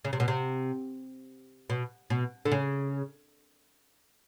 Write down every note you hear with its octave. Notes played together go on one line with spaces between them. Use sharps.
C#3
C3
B2
C3
B2
B2
D3
C#3